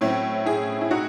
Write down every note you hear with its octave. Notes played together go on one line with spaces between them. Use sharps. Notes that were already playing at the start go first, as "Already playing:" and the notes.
A2 F#3 C4 C#4 E4
E4 G#4
E4
D#4 F#4